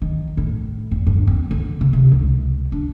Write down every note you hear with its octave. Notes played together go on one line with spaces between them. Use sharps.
D#3
A2
E2
G2
C4
D3
C#3
C3
C#2
D4